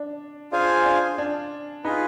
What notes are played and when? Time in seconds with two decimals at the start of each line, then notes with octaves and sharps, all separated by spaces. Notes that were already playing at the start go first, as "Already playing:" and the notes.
Already playing: D4
0.52 D4 F4 G#4 C5 F5 G#5
0.85 D4
1.18 D4
1.84 D#4 F4 G#4 B4